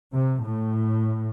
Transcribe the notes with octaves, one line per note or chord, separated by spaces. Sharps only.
C3
A2